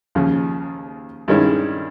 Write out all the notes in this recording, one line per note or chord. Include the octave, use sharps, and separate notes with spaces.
D#2 C#3 F3
G2 D#3 G#3 C#4 E4